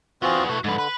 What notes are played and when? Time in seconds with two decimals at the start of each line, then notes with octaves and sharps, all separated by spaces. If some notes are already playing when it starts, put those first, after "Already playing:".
0.22 B3 C4 F4 F#4 G#4
0.49 E3 A3 F#4
0.64 G#2 D3 B4
0.78 B4